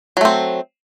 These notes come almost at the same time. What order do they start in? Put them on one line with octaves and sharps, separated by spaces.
F#3 A3 C4